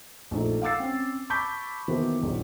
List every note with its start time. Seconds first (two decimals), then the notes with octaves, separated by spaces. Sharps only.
0.31 A#1 A3 D#4
0.62 F5 F#5 D6 E6 A6 C7
0.80 C4 C#4
1.30 A5 B5 C#6 D6 G6 B6
1.88 D#3 E3 A#3 B3 F#4 C5
2.21 D#1 A#1 D#3